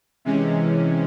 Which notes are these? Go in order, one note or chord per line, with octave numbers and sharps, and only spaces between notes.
C3 E3 G#3 C#4